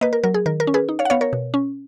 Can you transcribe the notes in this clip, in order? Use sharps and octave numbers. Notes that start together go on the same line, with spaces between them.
A#3 B4 D#5
A#4
F#3 A#4
G#4
D#3 A#4
A#4
C#4
G#4 B4
D#4
C#5 F5
F#5
B3 C#5 F5
A#4 C#5
B2
C#4